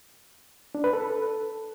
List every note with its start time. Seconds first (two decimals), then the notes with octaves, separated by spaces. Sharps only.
0.75 D4
0.84 B4
0.93 A4